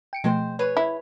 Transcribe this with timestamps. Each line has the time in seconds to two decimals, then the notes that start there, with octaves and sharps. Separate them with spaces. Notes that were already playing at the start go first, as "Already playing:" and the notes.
0.13 G5 C#7 D7
0.24 B2 F3 G#3 A3 C4 C5
0.59 G#4 B4 C#5
0.77 E4